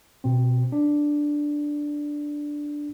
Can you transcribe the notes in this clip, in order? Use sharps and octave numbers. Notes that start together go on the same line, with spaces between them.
B2 C4
D4